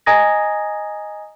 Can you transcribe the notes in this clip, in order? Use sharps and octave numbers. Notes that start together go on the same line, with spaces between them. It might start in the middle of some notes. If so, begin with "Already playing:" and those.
D#5 G#5 A#5 D#6 G#6 A#6